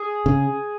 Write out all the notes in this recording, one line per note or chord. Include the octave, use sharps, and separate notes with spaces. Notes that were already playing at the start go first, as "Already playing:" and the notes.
Already playing: G#4
C#3